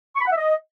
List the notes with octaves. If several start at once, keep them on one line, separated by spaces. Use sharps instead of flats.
C#6
B5
F#5
E5
D#5